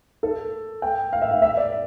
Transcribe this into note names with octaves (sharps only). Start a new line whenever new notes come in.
A4
G5
F5
E5
F5
E5
D5